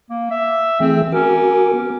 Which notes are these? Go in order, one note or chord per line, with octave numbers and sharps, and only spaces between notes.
A#3
E5
E3 A3 C4 G#4
C#4 F#4 A#4 D6
B3